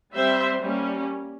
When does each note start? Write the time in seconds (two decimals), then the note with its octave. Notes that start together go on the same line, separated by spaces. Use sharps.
0.14 G3 C4 C5 E5
0.63 G3 A#3 C#4